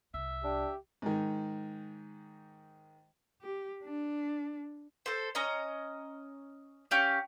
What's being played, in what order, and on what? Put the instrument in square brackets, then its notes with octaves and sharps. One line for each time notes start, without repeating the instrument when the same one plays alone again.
[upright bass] C2 [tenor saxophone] E5
[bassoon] D4 [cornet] G4
[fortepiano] G#2 D#3
[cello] G4
D4
[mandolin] A4 C5
C#4 D#5 A#5
C#4 G4 F5